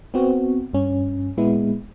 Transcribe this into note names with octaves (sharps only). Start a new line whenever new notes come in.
B3 C4 F#4
G2 C#4
A#2 G#3 B3 E4